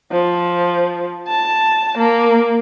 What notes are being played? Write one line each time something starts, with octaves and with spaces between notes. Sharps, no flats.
F3
A5
A#3